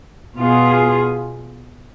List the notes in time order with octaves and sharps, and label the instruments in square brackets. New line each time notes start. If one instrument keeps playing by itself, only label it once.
[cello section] B2 B3 F4 G#4